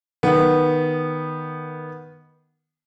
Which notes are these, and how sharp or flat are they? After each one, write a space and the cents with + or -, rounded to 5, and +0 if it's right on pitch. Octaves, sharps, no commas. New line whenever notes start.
D#3 -5 B3 -10